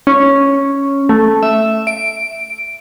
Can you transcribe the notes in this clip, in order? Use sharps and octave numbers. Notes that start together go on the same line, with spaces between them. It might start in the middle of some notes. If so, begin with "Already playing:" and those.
C#4
A3
E5
D7